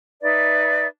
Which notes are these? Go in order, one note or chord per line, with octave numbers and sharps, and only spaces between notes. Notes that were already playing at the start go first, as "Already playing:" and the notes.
D#4 B4 D5 E5